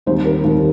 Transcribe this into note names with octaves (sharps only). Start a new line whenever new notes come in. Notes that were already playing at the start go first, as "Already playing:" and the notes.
D#2 D#3 G3 C4 C5
A#4
D#2 D#3 G3 C4